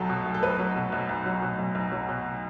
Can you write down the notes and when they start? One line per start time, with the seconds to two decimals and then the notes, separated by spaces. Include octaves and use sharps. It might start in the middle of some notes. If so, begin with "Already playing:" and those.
Already playing: B1 F#3 A4
0.10 B2
0.26 B1
0.34 A4
0.43 B1 B4
0.59 F#3
0.76 B2
0.92 B1
1.09 B1
1.26 F#3
1.42 B2
1.59 B1
1.75 B1
1.92 F#3
2.09 B2